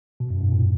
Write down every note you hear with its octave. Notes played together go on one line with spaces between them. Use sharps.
B2
F#2
G#2
A#2